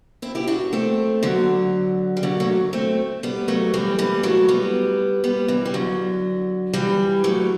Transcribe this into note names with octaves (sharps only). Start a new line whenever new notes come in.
C4 E4
E4 G4
D4 F#4
A3 C4
D3 F#3
G3
D3 F#3
F#3 A3
A3 C4
G3 B3
F#3 A3
E3 G3
E3 G3
F#3 A3
G3 B3
G3 B3
E3 G3
G3
D3 F#3
E3 G3
F#3 A3